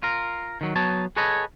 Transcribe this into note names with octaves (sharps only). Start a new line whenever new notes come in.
F4 A#4
D#3 F#3
F#3 B3 C#5 A5
G#4 A4 B4 C#5 D#5